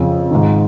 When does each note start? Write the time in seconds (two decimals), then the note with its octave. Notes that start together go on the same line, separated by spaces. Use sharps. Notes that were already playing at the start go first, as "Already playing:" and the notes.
Already playing: F2 C#3 F4
0.31 G#2 D#3